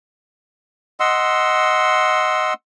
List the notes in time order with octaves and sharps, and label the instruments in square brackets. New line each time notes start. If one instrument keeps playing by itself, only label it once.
[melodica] D#5 F#5 C6 E6